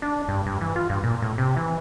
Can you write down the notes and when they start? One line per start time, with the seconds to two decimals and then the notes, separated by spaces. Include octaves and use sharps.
0.02 D4
0.28 G2
0.46 G2
0.61 E3
0.76 F4
0.90 G2
1.04 A#2
1.22 A2
1.38 C3
1.57 E3